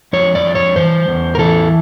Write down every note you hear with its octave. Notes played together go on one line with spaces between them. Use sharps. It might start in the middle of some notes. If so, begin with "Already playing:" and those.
F2 C#5
D5
F2
C#5
E3 C5
E2
A#4
E3 A4